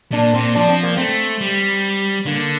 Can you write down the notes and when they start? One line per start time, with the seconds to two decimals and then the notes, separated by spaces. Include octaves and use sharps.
0.12 A#2 D4
0.33 A#2 C4
0.55 F3 D4
0.69 C4
0.83 A#3
0.96 A3 C4
1.41 G3
2.26 D3 A#3